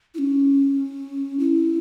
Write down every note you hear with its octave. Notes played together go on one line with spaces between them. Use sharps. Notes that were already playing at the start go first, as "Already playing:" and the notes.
E4
C#4
E4